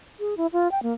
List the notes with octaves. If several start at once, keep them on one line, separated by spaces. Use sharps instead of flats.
G#4
E4
F4
G5
A#3